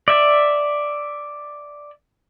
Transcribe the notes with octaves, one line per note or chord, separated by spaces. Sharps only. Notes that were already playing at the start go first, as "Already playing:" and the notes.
D5 E5